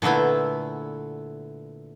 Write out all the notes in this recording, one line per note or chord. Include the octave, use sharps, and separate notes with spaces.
A#2 D3 A3 B3 E4